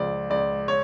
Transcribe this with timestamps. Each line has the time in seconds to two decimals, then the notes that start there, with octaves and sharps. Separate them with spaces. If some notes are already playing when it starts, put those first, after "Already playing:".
Already playing: C#2 F3 D5
0.30 C#2 D5
0.68 C#5